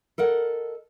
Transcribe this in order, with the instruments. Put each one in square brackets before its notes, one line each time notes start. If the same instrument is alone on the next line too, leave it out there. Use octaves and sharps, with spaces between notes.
[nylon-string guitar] A4 A#4 D#5 F#5